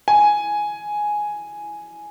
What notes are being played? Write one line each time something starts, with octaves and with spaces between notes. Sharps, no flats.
G#5